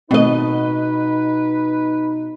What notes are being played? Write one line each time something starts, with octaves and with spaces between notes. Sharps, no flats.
B2 D#3 A3 C4 D#4 B4 D#5